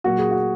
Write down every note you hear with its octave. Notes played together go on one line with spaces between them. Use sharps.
A#2 F#3 A#3 F#4
G#4
F#4